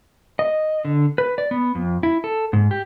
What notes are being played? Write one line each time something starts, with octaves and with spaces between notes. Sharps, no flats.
D#5
D3
B4
D5
B3
F2
E4
A4
G#2
G4